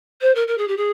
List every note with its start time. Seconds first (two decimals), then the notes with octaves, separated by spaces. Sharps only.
0.21 C5
0.35 A#4
0.47 A#4
0.57 G#4
0.67 G4
0.77 G#4